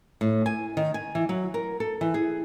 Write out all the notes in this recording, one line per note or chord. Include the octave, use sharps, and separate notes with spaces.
A2
G#5
D#3
G#5
E3
F#3
A#4
A4
E3
G#4